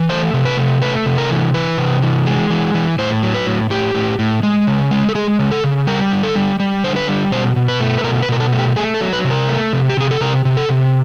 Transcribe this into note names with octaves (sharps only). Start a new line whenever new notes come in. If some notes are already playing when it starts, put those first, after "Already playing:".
Already playing: E3
A3 C5
C3
B4
A3
A3 B4
C3
A#4
E3
E3 B4
C3
E3
G#3
E3
E3
A2 C5
F#3
B4
A2
A2 G4
A2
A2
G#3
C#3
G#3
A4
G#3 G#4
C#3
A4
C#3
G3 A#4
D3
A4
G3
G3
D3 C5
B4
G3
B2 C5
B2
B4
A3
B4
B2 A#4
B4
B2 A#4
A4
A3
G4
A3 G#4
A4
F#3
B4
C3
A#4
A3
C3
G4
C3 G#4
A4
C3 A#4
C3
A4
C3